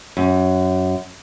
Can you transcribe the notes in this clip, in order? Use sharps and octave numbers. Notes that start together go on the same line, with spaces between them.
F#2